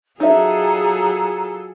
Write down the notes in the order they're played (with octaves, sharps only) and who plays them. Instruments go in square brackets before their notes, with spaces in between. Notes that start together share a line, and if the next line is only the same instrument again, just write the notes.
[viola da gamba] F#3 F4 [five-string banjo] D#4 E5 [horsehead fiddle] G#4 A4 [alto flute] A#5